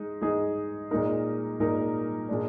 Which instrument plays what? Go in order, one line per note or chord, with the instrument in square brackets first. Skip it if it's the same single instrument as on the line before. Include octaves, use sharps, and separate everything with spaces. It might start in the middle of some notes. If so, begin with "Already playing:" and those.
Already playing: [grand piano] G#3 D#4
G#3 D#4 G#4
A#2 G#3 D#4 A#4
A#2 G#3 D#4 A#4
A#2 G#3 D4